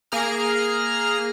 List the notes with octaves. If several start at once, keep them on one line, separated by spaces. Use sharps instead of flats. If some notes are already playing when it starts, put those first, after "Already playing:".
A#3 G#4 A#5 F6